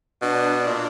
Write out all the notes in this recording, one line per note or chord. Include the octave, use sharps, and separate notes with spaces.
B2 D4
A#2